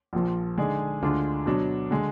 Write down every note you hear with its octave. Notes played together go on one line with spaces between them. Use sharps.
A#1 A#2 F3
D3 G#3 D#4 G#4 D5
D2 D3 G#3 D4 F4
B2 F#3 D4
D3 G#3